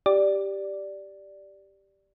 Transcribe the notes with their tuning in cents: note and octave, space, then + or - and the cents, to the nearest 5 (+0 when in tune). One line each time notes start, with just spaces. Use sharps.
G4 +0 D5 +0